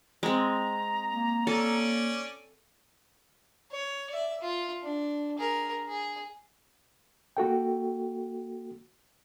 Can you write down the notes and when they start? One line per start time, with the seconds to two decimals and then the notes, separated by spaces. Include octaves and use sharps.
0.23 G#3 C4 A#5
1.11 A#3
1.47 C#4 A4 D5
3.72 C#5
4.10 D5 E5
4.41 F4
4.83 D4
5.38 G#4 A#4
5.88 G#4
7.37 A#3 F#4 A4 G5